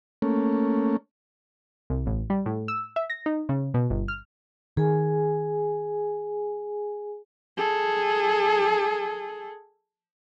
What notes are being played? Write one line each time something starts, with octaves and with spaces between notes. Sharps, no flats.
A3 A#3 C#4
C2
A1
G3
A2
E6
E5
A#6
D#4
C#3
B2
G1
F6
D#3 G#4 G#5
G#4 A4